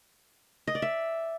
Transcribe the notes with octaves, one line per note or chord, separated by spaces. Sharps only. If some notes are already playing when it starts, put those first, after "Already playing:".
D#5
D5
E5